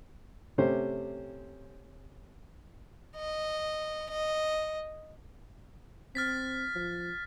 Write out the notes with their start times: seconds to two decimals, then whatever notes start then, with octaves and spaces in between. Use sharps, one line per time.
0.58 C3 A3 C#4 G4 C5
3.16 D#5
4.10 D#5
6.15 C4 F6 A6 B6
6.75 F3